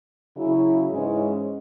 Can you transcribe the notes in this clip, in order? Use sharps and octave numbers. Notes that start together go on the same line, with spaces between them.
C#3 F#3 C#4 E4
G#2 E3 G#3 C#4 G#4